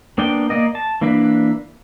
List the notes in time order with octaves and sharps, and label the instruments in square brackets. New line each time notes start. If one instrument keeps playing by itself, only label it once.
[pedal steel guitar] A#3 B3 D4 D5 G5
A#3 D5 D#5
A5
E3 A#3 D4 B4